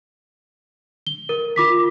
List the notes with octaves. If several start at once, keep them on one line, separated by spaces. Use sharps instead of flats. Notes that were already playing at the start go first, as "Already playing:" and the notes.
G7
A#4
F4 D6 B6